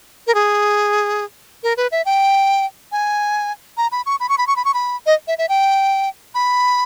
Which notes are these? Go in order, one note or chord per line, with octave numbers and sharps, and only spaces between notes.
A#4
G#4
A#4
B4
E5
G5
G#5
A#5
B5
C#6
B5
C#6
B5
C#6
B5
C#6
B5
D#5
E5
E5
G5
B5